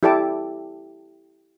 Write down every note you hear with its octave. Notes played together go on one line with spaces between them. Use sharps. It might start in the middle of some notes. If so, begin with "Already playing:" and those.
E4 G4 A4 D5 A5 D6